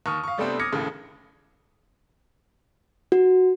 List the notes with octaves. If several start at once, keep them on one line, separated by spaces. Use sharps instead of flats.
D#2 C#6 D#6 F6
F5 C#6
C3 G3 A3 B3 C4 D4
D6 D#6 F6 G#6 A#6 C#7
A#1 D#2 A2 C#3
F#4